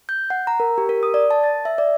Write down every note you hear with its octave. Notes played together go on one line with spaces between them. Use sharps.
G6
F#5
A#5
A#4
G4
A#4
D#6
D5
A5
A6
E5
D5